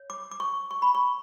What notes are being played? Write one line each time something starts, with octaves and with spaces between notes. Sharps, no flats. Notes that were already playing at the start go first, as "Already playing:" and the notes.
Already playing: C#5
D6
D6
C#6
C#6
B5
C#6